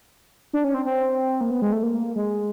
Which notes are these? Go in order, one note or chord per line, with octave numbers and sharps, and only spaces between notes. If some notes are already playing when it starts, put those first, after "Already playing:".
D4
C#4
C4
C4
A#3
B3
G#3
A3
A#3
G#3